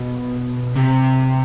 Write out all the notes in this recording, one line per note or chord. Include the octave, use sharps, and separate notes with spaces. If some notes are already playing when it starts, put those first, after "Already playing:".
Already playing: B2
C3